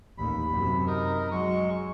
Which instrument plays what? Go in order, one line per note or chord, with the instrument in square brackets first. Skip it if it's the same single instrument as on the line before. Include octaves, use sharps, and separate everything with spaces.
[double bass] A1 D#2 [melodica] B5
[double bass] F#2 C3
[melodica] D#4 A#4
[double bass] F#3 [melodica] G#3 C#6